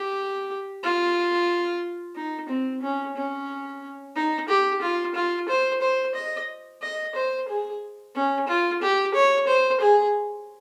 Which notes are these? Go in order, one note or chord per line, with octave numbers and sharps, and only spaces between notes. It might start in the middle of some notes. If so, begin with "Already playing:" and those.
Already playing: G4
F4
D#4
C4
C#4
C#4
D#4
G4
F4
F4
C5
C5
D#5
D#5
C5
G#4
C#4
F4
G4
C#5
C5
G#4